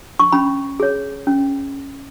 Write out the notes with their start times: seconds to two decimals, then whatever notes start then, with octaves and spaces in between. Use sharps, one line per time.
0.20 C#6
0.32 C#4 B5
0.80 G#4 C#5
1.27 C#4